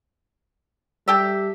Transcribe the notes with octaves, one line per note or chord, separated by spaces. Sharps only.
G3 G4 A4 E5